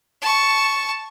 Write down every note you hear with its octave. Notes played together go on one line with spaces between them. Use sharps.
A5 C#6